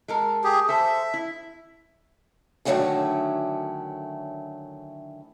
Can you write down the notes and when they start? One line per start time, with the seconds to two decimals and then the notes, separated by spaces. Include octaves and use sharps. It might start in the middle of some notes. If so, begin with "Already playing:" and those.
0.08 G#3 A4 A#4
0.44 G4 G#4
0.69 A4 C5 E5
1.14 E4
2.65 D3 D#3 F#3 A3 C#4 E4